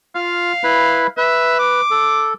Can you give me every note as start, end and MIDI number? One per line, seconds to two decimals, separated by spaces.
0.15 0.53 65
0.15 1.09 77
0.64 1.07 64
0.64 1.07 71
0.64 1.07 83
1.17 1.81 71
1.17 1.54 76
1.59 2.31 86
1.91 2.34 69